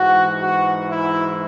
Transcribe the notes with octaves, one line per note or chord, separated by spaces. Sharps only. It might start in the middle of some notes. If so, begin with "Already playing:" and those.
Already playing: G#2 E3 F#4
F#4
E4